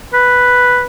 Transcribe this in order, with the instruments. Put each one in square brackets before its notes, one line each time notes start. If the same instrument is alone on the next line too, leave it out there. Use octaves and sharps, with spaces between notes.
[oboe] B4